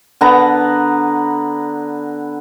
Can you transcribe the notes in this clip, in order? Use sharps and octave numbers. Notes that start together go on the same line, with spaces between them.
D3 B3 A#5